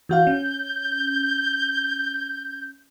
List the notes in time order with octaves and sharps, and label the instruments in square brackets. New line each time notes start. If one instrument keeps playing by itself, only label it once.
[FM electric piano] E3 F#4 F5 [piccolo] G6
[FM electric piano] C#4